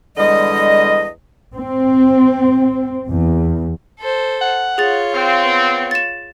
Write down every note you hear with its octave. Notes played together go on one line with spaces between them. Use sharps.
E2 D3 G3 G#3 D#5
C4
E2
A4 C5
F#5
F4 G#4 C#5 A6
C4 F5
B3
A6 E7